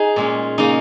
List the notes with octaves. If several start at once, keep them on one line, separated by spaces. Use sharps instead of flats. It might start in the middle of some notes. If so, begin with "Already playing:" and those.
Already playing: D#4 G#4
A#2 G#3 C#4
C#3 A#3 C#4 D#4